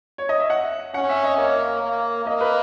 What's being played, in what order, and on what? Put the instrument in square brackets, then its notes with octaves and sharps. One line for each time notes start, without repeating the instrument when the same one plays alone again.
[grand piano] C#5
D#5
E5
F#5
[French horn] C#4 [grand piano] F#5
[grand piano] E5
D#5
[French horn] A#3 [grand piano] C#5
[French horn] A#3
[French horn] A#3 [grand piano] D#5
[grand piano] B4